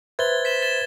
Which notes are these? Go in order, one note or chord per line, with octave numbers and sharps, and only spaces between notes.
B4 C5 E5 G#6 A6 G7
B6 E7 G7
A6 E7 G7